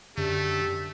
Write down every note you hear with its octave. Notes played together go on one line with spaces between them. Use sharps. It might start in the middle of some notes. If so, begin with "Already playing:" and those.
F#2 D3 A3 G4